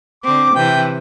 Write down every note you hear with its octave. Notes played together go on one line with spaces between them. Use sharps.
D3 C4 D6
C3 E3 G5